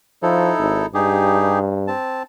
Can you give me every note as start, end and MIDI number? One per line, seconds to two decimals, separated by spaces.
0.23 0.51 53
0.23 0.86 63
0.23 0.86 64
0.23 0.86 69
0.58 0.84 32
0.94 1.91 43
0.94 1.59 63
0.94 1.59 67
0.94 1.59 68
1.88 2.23 60
1.88 2.23 81